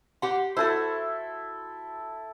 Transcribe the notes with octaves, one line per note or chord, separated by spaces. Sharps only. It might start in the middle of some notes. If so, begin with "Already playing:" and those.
G4 F#5 C6
E4 F#4 A4 C5